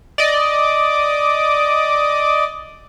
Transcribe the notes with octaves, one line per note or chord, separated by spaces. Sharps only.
D5 D#5